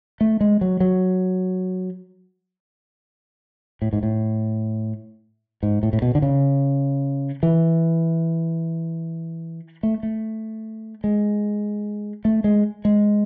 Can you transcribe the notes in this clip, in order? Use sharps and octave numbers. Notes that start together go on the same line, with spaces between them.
A3
G#3
F#3
F#3
A2
G#2
A2
G#2
A2
A2
B2
D3
C#3
E3
A3
A3
G#3
A3
G#3
G#3